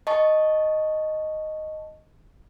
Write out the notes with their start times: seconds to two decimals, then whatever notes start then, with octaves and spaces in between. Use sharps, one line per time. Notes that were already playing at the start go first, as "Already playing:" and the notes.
0.07 D#5 A5 C#6